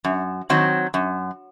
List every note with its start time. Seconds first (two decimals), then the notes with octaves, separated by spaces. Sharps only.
0.05 F#2
0.50 D#3 F#3 C4
0.94 F#2